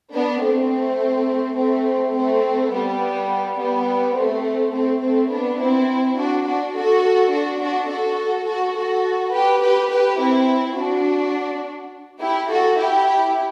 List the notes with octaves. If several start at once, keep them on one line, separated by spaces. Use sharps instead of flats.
B3 D4
A3 C4
A3 C4
A3 C4
G3 B3
G3 B3
A3 C4
A3 C4
A3 C4
B3 D4
C4 E4
D4 F#4
D4 F#4
F#4 A4
D4 F#4
D4 F#4
F#4 A4
F#4 A4
F#4 A4
G4 B4
G4 B4
G4 B4
C4 E4
D4 F#4
E4 G4
F#4 A4
E4 G4